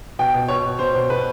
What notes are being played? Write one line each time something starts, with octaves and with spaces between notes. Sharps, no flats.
B2 G5
B2
B2 C#5
B2
B2 C5
B2
B2 B4